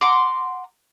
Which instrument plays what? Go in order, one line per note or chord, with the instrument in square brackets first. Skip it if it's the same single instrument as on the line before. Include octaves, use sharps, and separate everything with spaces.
[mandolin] F#5 A#5 C6 D6